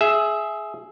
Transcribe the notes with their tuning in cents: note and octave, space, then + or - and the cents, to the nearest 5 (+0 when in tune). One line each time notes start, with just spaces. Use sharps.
G#4 +15 E5 +0